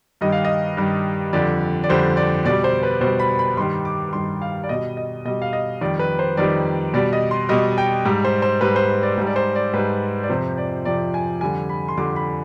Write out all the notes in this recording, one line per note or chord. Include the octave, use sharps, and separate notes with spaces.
G2 D#3 G3 D#5
F5
D#5
G2 D#3 G3
F2 D3 G3 D5
D5
F2 D3 G3 C5
D5
B2 G3 D5
C5
B4
B2 G3 C5
B5
B5
G2 D#3 G3 C6
D6
G2 D#3 G3 C6
F5
D5
B2 G3 D#5
D#5
B2 G3 D#5
F5
D#5
F2 D#3 G3 D5
B4
C5
F2 D#3 G3 D5
B2 G3 D5
D#5
C6
B2 G3 D#5
G5
G#2 G3
C5
C5
G#2 G3 B4
C5
D5
G#2 G3
D5
C5
D5
G#2 G3 B4
D5
F2 C3 F3 C5
D5
F2 C3 F3 D5
G#5
F2 D3 G3 G#5
B5
C6
F2 D3 G3 D6
B5